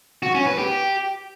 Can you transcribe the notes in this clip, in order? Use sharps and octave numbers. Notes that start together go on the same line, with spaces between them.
F#4
C#4
B4
G4